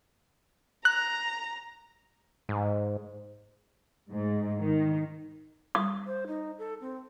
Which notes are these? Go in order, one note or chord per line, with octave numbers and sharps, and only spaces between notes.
A#5 F#6
G#2
G#2
D#3
D#6
C5
D#4
A4
C4